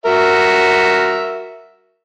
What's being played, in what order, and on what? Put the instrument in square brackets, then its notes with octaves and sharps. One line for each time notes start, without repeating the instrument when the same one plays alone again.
[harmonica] F#4 A#4 E5